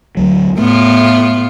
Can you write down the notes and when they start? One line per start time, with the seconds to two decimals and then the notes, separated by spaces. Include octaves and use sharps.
0.17 D2 F#3
0.58 A2 A3 B3 F4